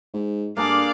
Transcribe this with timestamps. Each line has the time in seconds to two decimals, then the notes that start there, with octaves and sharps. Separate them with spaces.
0.13 G#2
0.57 G2 A#3 D4 G#4 D5 F5